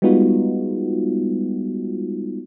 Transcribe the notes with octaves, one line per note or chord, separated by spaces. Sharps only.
G3 G#3 B3 D#4 F4 F#4